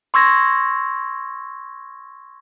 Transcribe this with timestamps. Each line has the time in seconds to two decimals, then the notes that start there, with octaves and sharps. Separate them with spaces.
0.14 C6 C#6 E6 G#6 A#6